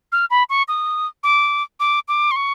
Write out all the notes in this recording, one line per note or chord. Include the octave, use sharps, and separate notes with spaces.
F6
B5
C#6
D#6
D6
D6
D6
C6
C#6